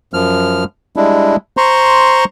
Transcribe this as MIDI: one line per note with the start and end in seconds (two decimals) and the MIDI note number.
0.14 0.64 42
0.14 0.64 53
0.14 0.64 89
0.96 1.36 55
0.96 1.36 56
0.96 1.36 62
0.96 1.36 64
1.57 2.25 72
1.57 2.25 82
1.57 2.25 84
1.57 2.25 85